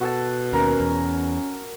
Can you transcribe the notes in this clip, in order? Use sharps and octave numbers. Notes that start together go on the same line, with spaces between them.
B2 F#4 A4 A5
D#2 C#4 A#4
E2